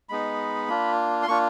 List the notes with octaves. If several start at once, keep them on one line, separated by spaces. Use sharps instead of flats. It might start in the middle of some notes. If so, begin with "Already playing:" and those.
G#3 B3 D#4 B5
A#3 D4 F4
C6
A#3 D4 F4 C#6